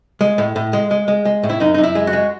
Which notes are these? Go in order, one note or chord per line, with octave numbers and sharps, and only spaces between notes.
G#3
A2
A2
G#3
G#3
G#3
G#3
A2
E4
F#2 D#4
D#4
F#2
E4
G#3
F#4
G#3